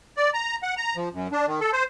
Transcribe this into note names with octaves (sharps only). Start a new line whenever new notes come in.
D5
A#5
F#5
A#5
F3
F#2
D4
D#3
A4
C5